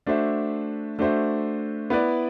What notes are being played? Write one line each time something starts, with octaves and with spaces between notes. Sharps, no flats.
A3 D4 F#4 C5 E5
A3 D4 F#4 C5 E5
B3 E4 B4 D5